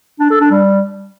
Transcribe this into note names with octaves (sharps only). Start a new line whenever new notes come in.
D4
A4
D4
G3